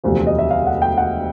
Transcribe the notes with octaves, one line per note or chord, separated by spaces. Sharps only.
E1 D2 C3 F3
D#5
E5
F5
F#5
G5
F#5